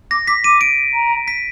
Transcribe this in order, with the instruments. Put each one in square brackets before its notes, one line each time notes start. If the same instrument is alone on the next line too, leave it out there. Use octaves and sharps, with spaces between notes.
[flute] D6 [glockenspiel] A#6
[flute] D6 [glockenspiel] B6
[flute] D6 [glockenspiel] D#7
[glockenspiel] D7
[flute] A#5
[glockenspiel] B6